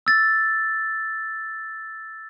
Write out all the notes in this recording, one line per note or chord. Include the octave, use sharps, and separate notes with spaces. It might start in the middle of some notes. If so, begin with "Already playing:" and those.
E6 A6